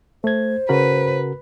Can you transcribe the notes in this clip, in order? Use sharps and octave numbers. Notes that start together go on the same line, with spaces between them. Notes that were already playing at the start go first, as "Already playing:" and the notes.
A3 C5 G#6
C#3 F#4 A#4 B4